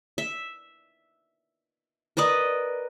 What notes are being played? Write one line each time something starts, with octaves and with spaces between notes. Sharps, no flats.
E5
A#4 B4 D5 D#5